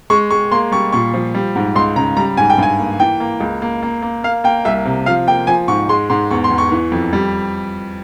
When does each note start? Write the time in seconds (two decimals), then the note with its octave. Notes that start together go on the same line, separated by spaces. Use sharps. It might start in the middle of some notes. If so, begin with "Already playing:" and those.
0.10 G#3 C#6
0.31 G#3 C#6
0.51 A#3 C6
0.72 G3 C#6
0.92 A#2 C#6
1.14 F3
1.35 G3
1.56 G#2
1.76 C#2 C6
1.96 C#3 A#5
2.17 G3 A#5
2.37 G#2 G#5
2.50 G5
2.58 G2 G#5
2.79 A#3
3.00 E3 G5
3.20 A#3
3.41 C#2
3.62 A#3
3.83 A#3
4.02 A#3
4.24 A#3 F5
4.44 A#3 G5
4.65 C2 E5
4.85 C3
5.06 F3 F5
5.27 A#3 G5
5.47 F3 G#5
5.68 G#2 C#6
5.89 G#3 C6
6.10 G#2 C6
6.31 E2 C#6
6.44 C6
6.50 E2
6.58 C#6
6.72 E3
6.92 F2
7.13 G3